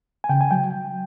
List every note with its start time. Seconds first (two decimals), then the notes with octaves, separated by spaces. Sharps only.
0.24 G#5
0.29 C#3 G5
0.41 G#5
0.51 F#3 G5